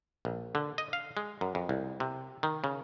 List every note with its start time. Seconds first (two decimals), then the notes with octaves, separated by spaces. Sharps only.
0.25 A#1
0.55 D3
0.78 D#5
0.93 F5
1.17 G#3
1.41 F#2
1.55 F2
1.69 C2
2.00 C3
2.43 D#3
2.64 C#3